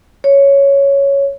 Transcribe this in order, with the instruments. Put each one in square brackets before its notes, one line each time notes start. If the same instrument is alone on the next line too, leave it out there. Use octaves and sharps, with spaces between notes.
[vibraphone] C#5